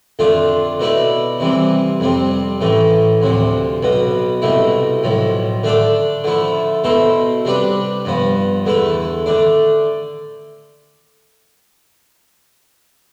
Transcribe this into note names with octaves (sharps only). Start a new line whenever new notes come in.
F2 D3 A3 D4 F4
B2 A3 E4 B4 D5
C3 E3 G3 C4
F2 C3 G3 C4
A1 A2 E3 A3
D2 C3 F3
B1 B2 B3
C2 B2 A3 E4
B1 A2 F3
D3 A3 D4 A4 D5
D3 F3 A3 E4
B2 A3 E4 A4 C5
C3 G3 D4 G4 B4
G2 F3 B3
E2 D3 A3 E4 B4
D3 A3 D4